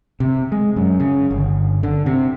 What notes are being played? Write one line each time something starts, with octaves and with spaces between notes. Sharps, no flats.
C3
G#3
F#2
C#3
G1
D3
C3